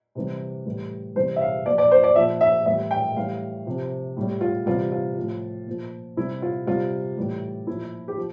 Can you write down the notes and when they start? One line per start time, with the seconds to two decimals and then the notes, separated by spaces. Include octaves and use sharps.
0.15 C3 E3 G3
0.66 A2 E3 G3
1.16 C3 E3 G3 C5
1.36 E5
1.41 F5
1.66 A#2 F3 D5
1.78 D5
1.91 C5
2.04 D5
2.16 A#2 F3 E5
2.41 E5
2.66 A2 E3 G3 E5
2.91 G5
3.16 A2 E3 G3 F5
3.66 C3 F3
4.17 A2 G3
4.41 F4
4.66 C3 E3 G3 F4
4.92 F4
5.17 A2 F3
5.67 A#2 F3
6.17 C3 G3 E4
6.42 F4
6.66 C3 G3 F4
7.17 A2 E3 G3
7.67 A#2 F3 E4
8.08 G4
8.17 F3